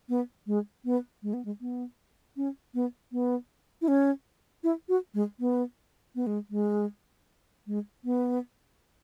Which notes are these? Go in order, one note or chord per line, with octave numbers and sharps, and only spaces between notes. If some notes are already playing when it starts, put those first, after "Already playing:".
B3
G#3
B3
G#3
B3
G#3
B3
C#4
B3
B3
E4
C#4
E4
F#4
G#3
B3
B3
G#3
G#3
G#3
B3